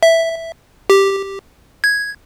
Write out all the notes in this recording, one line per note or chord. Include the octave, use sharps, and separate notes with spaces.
E5
G4
G#6